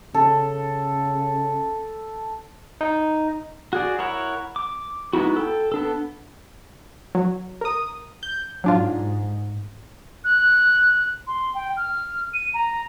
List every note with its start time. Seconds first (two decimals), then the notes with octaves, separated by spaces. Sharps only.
0.14 C#3 A4
2.81 D#4
3.73 F#4 G#4 D5
3.99 E4 A#4 C#5 F#5
4.56 D6
5.13 G#3 B3 D#4 E4 F#4
5.37 A4 G5
5.72 B3 D4 A4
7.15 F#3
7.61 A#4 D#6
8.23 G6
8.64 G#2 F#3 D4 F4
10.24 F#6
11.27 C6
11.54 G5
11.77 F6
12.34 D#7
12.54 A#5